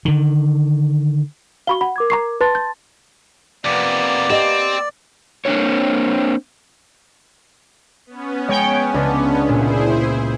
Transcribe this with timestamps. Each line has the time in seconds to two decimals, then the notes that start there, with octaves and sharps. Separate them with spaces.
0.05 D3 D#3
1.67 F#4 F5 B5 C#6 G7
1.81 F#5 B5
1.96 A#4 D6 G#6
2.10 A#5 C#6 C7
2.41 B4 A5 C6 A6
2.55 G6
3.65 F2 C3 A#3 B3 D5
4.30 C4 G4 D#5
5.45 A#3 C4 D4 F#4 G4 C#5
8.06 B3 C#4
8.49 G#3 C#5 G5
8.94 C#2 D4
9.49 A#2 E4 G#4 C5